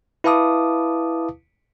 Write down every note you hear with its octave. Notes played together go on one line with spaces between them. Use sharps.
E4 B4 F5 A5 D6 D#6